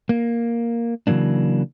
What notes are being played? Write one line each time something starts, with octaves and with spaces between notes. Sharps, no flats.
A#3
C#3 E3 F#3 A#3 D4